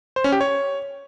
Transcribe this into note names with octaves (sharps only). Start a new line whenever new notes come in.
C5
C#4
G4
C#5